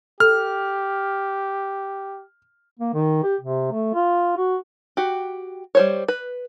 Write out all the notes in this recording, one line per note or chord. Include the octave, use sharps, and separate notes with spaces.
G4 A4 F6
A#3
D#3
G4
C3
A3
F4
F#4
F#4 G4
G3 C5 C#5
B4